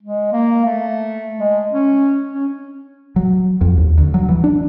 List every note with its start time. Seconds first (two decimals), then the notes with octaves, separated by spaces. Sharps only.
0.03 G#3
0.32 A#3
0.65 A3
1.39 G#3
1.72 C#4
2.33 C#4
3.16 F#3
3.61 F2
3.77 D#2
3.98 D2
4.14 F#3
4.29 E3
4.44 D4